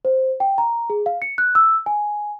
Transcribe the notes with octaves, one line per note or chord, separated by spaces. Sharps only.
C5
G5
A#5
G#4
F5
C#7
F#6
E6
G#5